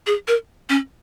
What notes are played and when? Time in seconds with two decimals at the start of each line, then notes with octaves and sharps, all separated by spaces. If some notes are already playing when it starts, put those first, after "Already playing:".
0.07 G#4
0.28 A#4
0.69 C#4